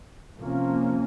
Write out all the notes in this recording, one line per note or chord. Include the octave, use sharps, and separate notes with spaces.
C3 F3 A#3 C#4